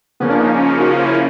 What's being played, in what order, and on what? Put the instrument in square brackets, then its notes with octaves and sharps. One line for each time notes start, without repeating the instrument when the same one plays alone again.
[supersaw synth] C#3 F3 A#3 C#4 [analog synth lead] B3
[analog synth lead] D4
D#4
F#4
F4
E4